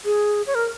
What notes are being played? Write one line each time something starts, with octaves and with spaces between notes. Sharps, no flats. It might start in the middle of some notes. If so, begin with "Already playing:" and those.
G#4
C#5
A#4